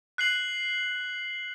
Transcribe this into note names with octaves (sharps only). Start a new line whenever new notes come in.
F#6 C7 F#7